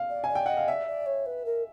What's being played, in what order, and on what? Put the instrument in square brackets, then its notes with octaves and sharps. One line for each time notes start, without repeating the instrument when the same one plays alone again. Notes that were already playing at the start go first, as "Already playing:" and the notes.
Already playing: [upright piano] F5
[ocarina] D5
[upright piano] G#5
[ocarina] D5
[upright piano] G5
[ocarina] D#5 [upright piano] F#5
[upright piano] F5
[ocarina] D5 [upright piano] E5
[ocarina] D5
C#5
B4
A#4